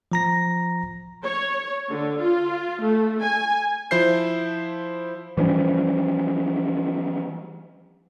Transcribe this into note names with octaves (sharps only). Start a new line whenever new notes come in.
F3 A#5 A#6
C#5
D3
F4
A3
G#5
F3 E4 C5 G6 C7
E3 F3 G3 C#4